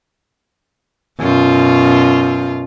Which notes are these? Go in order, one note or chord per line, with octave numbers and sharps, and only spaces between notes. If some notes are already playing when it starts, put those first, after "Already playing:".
F#2 B2 F4